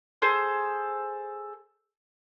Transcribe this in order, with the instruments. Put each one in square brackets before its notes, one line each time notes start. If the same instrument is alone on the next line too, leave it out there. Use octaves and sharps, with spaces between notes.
[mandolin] G#4 A4 C5